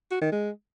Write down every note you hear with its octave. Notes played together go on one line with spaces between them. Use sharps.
F#4
D#3
G#3